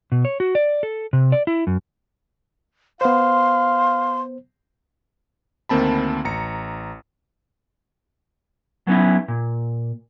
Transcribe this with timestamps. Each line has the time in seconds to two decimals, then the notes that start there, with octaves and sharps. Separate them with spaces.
0.12 B2
0.25 C#5
0.40 F#4
0.55 D5
0.83 A4
1.13 C3
1.32 D5
1.47 E4
1.67 F#2
3.01 B3 C5 F5 C6
5.69 D2 D#3 A#3 C4 A5 B5
6.25 A1 A#5 C#7
8.87 F#3 B3 C#4 D#4 E4
9.28 A#2